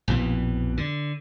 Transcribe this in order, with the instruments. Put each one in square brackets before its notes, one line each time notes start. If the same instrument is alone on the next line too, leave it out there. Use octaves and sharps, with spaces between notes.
[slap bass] A#1 F2 B2 E3
D3